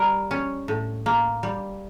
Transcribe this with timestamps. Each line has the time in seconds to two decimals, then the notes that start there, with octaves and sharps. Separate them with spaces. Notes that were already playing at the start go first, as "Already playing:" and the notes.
Already playing: G3 A#4
0.31 C#4
0.68 A2
1.06 A#3
1.43 G3